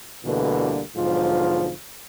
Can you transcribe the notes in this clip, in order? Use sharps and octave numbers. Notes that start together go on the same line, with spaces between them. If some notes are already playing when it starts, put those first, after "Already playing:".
D2 B2 D3 E3 G3 A#3
B1 G#2 D3 F3 F4